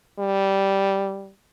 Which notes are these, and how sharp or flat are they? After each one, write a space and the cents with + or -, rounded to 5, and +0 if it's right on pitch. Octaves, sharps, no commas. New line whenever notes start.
G3 -5